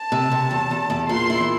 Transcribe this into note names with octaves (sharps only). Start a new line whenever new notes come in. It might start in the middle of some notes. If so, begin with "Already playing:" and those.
Already playing: A5
C3
C3
E2
E2
E2
A#2 C6
E4